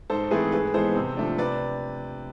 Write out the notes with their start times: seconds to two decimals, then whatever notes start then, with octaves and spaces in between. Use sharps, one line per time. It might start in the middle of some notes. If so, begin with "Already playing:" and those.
0.10 G#2 A4 C5
0.31 E3 A3 C4 G#4 B4
0.52 G#2 G#4 B4
0.74 E3 G#3 B3 A4 C5
0.95 C3
1.17 F3 A3 D4
1.38 C3 B4 D5